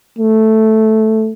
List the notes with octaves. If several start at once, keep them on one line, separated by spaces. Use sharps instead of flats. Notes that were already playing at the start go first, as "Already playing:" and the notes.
A3